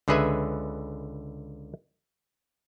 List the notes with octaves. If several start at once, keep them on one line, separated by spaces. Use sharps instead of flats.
C#2 D3 G#4 B4 E5 G#5